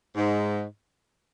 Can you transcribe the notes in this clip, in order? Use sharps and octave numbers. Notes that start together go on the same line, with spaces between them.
G#2